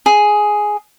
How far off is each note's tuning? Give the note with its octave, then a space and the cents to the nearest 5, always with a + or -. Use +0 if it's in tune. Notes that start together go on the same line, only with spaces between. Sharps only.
G#4 +5